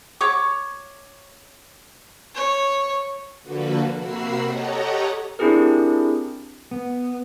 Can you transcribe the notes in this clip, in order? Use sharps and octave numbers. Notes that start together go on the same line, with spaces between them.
C#5 C#6 D6
C#5
D3 F3 A#3 F#4 A4 B4
C3 A#3 F#4 B5 E6 C7
G4 A4 C#5 D#5 F#5 A#5
C4 D4 E4 G4 G#4 A#4
B3